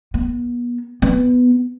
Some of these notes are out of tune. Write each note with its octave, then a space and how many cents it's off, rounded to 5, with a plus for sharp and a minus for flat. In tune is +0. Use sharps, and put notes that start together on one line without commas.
B3 -35
B3 +5